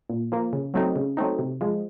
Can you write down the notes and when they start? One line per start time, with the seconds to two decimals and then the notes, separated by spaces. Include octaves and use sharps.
0.09 A#2
0.32 F3 A#3
0.53 C#3
0.74 F#3 A3 C4 D#4
0.96 C#3
1.17 F#3 A3 C4 D#4
1.39 C3
1.61 F3 G#3